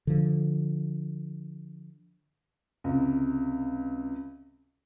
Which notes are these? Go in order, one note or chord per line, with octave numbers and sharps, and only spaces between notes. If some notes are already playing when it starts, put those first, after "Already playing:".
D3 F3
C#2 C3